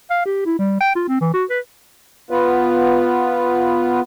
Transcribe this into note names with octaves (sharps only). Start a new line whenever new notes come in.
F5
G4
E4
G3
G5
F4
C4
E3
F#4
B4
B3 F4 B4